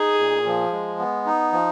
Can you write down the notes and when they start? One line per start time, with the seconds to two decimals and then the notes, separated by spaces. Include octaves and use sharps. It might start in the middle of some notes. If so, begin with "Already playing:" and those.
Already playing: D#4 G#4
0.18 A#2
0.46 F3
0.72 G#3
0.99 B3
1.26 D#4
1.52 F3